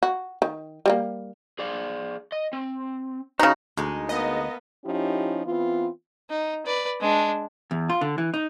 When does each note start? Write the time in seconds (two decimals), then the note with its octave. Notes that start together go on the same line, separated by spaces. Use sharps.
0.03 F#4
0.42 D#3
0.86 G3 G#3 A#3
1.59 G#4 D5 F5
2.32 D#5
2.53 C4
3.39 C#3 D#4 F#4
3.77 D2 G#3 D#4
4.09 A#3 B3 D#5
4.85 F3 C#4 D#4 E4 G4
5.46 E3 B3 C4 F4
6.30 D#4
6.66 B4 D5
7.00 G#3 D4
7.71 E2
7.90 F4
8.01 D3
8.18 E3
8.34 D#4